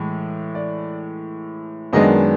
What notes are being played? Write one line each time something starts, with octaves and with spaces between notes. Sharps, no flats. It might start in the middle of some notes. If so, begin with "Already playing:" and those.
Already playing: A2 E3 G#3
D5
F#2 D#3 G#3 B3 D4 D#5